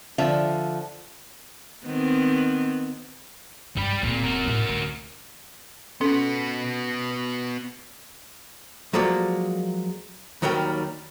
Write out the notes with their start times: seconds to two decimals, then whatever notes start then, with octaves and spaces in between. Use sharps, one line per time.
0.18 D3 F3 E5
1.86 D#3 B3 C4
3.77 G2 G3 B5
4.02 D1 A#2 D#4
4.24 F#4 A#4
4.47 A2
4.69 D2
6.01 B3 C#4 F#4 A4
8.93 F3 F#3 G#3 A#3 A4 D5
10.42 D#2 D#3 F#3 G3 A#4 G5